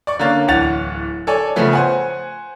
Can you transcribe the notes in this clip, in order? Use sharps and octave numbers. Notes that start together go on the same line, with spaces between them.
D5 C#6
D3 A#3 C#4 F5 A6
D1 E3 F#5 A6 F7
A4 C#5 D5 G#5
C#3 F3 A3 B3 C#4
C5 F#5 G#5